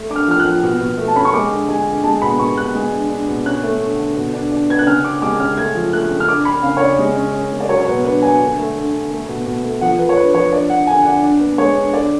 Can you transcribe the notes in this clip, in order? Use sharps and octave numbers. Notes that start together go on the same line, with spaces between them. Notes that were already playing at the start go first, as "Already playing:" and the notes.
Already playing: A3
D4 D6
F6
F3 F6
F#6
F3
B2
B2
A3
A5
C#4 B5
C#6
G#3 D6
D3
G#3 G#5
D3
G#3 A5
B2 B5
B2 C#6
B2 F#6
G#3
D4
D4
B2
C#4 F#6
A3
D3
D3
B2
D4
D4
B3 G#6
F#6
C#3 F6
D4 D6
G#3 D6
C#3 F6
A3 G#6
F3
A3 F#6
C#3
F6
D4 D6
D4 B5
C#3 F5
C#5
C#3 D5
G#3
C#4
C#4
G#3
D5
F#3 C#5
C#5
B2 B4
D4 B4
F#3 G#5
D3
A3
D3
D3
A3
B2
B2
A3
F3 F#5
F3 B4
C#5
D4 B4
F3 C#5
D4 D5
D4 F#5
D3 G#5
D4 F#5
D4
B3
G#3 C#5
D4
D3 D5